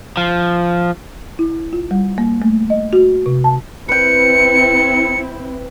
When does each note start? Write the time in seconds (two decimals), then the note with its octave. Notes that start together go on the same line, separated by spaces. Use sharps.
0.17 F3
1.39 E4
1.73 F4
1.91 G3
2.18 A#3
2.42 A3
2.70 D#5
2.93 F#4
3.26 C3
3.44 A5
3.89 C4 E4 B4 G5 C#7